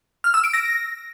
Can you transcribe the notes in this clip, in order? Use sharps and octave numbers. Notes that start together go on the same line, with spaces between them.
F6
E6
D7
A#6